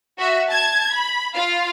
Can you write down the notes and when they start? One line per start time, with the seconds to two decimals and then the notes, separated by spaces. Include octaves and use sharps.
0.18 F#4 E5
0.49 A5 G#6
0.92 B5
1.34 F4 F5